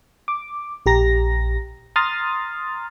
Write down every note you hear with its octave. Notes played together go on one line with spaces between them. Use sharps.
D6
A#1 G4 A#5 A#6
A#5 C6 D#6 F6 A6